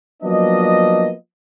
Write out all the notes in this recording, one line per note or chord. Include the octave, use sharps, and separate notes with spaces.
F3 F#3 A#3 B3 D4 D#5